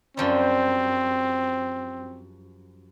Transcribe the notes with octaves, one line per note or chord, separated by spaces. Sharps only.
F#2 F3 G3 C4